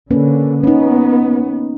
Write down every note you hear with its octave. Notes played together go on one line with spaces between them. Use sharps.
D3 A#3 C#4 B4
B3 C#4 D#4